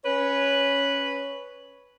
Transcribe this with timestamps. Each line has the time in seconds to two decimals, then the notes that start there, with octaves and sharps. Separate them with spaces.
0.05 C#4 B4 C#5